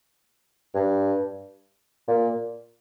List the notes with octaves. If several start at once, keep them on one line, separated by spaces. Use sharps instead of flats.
G2
A#2